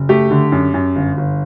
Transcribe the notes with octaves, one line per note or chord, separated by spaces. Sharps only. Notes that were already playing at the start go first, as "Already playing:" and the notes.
Already playing: F#1
A3 G4
D3
F#2
F#2
G1
G1